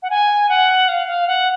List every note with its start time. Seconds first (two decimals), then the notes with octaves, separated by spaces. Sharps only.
0.02 F#5
0.10 G#5
0.49 F#5
0.88 F5
1.07 F5
1.27 F#5